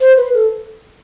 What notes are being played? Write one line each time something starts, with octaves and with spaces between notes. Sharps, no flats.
C5
B4
A4